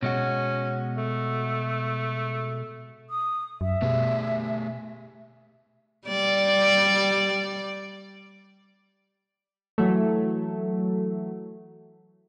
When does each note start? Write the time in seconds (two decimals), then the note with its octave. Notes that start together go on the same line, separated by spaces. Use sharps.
0.03 B2 G#3 C#4 F#4
0.97 A3
3.10 D#6
3.61 F#2 E5
3.82 B2 A3 G4 G#4
6.08 G3 D5
9.78 E3 F#3 A3